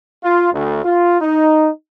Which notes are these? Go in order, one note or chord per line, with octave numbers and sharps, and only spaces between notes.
F4
D2
F4
D#4